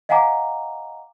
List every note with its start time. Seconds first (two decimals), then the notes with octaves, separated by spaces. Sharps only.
0.09 D#5 F5 F#5 G#5 A#5 D6